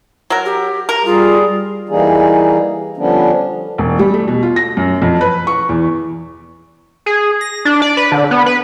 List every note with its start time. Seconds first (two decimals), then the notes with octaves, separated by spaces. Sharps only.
0.30 F#3 A#4
0.45 G4
0.89 A#4 A#5
1.05 G3 F4 G#4
1.89 E3 G3 A#3 D#4 G#4
2.97 D3 F3 G3 B3 C#4 D4
3.78 E1
3.99 G3
4.14 A3
4.28 B2
4.43 F4
4.56 A#6
4.77 F#2
5.02 F2
5.21 B4
5.47 C#6
5.69 E2
7.06 G#4
7.41 A#6
7.65 D4
7.82 D5
7.97 B4
8.12 D3
8.31 B3
8.46 B4